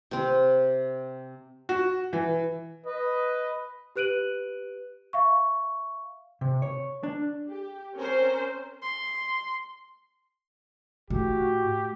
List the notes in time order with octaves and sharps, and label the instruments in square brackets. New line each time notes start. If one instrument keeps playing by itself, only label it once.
[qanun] C3 C4
[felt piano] F#4
E3
[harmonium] B4 [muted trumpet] D#5
[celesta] G4 B4 F#6 D7 D#7 F#7
E5 F5 C#6
[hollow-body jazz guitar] C3
C#5
D4
[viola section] G4
C4 C#4 A#4 C5
[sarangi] C6
[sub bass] A2 [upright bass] A3 [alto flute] F#4 [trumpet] G4